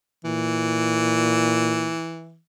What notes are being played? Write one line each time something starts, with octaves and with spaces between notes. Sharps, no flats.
A#2 E3